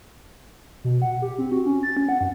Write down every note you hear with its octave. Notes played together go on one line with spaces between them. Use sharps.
B2
F#5
G4
C4
F#4
C#4
A6
C#4
F#5
F#2